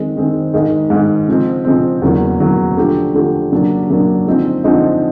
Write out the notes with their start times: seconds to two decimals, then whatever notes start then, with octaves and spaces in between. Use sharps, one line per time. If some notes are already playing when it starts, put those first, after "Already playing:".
Already playing: D#3 G#3 C4
0.16 D#3 G#3 C4
0.54 G#2 D#3 G#3
0.90 G#2 D#3 G#3
1.28 C#3 F3 G#3 C4
1.65 C#3 F3 G#3 C4
2.02 E2 C#3 F#3 A#3
2.40 E2 C#3 F#3 A#3
2.77 D3 F3 A3 D4 G4
3.14 D3 F3 A3 D4 G4
3.52 C#3 F#3 A#3 D4
3.90 C#3 F#3 A#3 D4
4.26 D3 F3 G#3 C4 D#4
4.64 D3 F3 G#3 C4 D#4